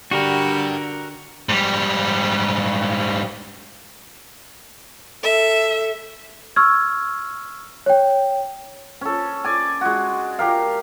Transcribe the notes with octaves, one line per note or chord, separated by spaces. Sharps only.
D3 G3 D4 F#4 G4 A#4
G#2 G3
A4 E5
C#6 E6 F6 G#6
C#5 G5
C#4 A4
D5 G#5
G#3 F#4
G4 A#4 F5